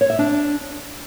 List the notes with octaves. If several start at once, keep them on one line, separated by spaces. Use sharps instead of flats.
C#5
E5
D4